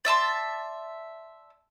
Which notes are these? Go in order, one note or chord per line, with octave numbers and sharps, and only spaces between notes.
D5 E5 A5 C6